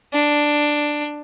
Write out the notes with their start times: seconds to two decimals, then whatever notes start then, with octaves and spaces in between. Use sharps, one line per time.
0.13 D4